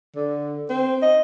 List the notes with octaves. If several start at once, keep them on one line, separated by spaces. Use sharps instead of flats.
D3
C4
D#5